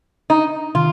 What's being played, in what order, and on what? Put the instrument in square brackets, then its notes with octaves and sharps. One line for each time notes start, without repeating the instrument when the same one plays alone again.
[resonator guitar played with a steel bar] D#4
[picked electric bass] C3 D#3 [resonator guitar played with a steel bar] F4